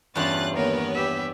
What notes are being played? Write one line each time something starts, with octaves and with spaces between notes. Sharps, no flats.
E2 G2 C#4 F4 F#6 A6
D#2 B3 A#4 C#5
G4 E5